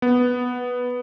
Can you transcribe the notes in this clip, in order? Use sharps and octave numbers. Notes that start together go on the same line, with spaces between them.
B3